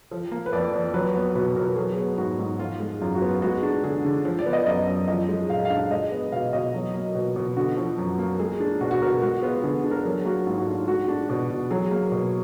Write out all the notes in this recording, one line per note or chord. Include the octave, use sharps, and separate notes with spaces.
F3
A#3
B4
F2 D5
F2
F#3 B4
B3
B2 B4
B2 A#4
F#3 G#4
B3
G#2 F#4
G#2
F3 F4
G#3
F#2 F4
F#4
B3
F4
G#3 F#4
D4
D3 G#4
D3
F3
D5
B3
D#5
F#2 D#5
F#2
F3 D#5
G#3
A#2 F5
F5
D4
G#3 D#5
B3
B2 F5
B2 D#5
F#3
A#3
B2
B2
D3 F#4
F3
F#2
A#3
G#3 G#4
D4
B2 F#4
F#4
B2 A#4
G#3 F#4
B3 F4
D3 G#4
D4
A#4
F#3 G#4
A#3 F#4
G#2 F4
F#4
D4 F4
G#3 F#4
D4
B2 F#4
B2
F#3 G#4
A#3
B2